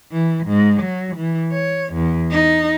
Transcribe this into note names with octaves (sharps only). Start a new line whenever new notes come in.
E3
G#2
F#3
E3
C#5
E2
D#4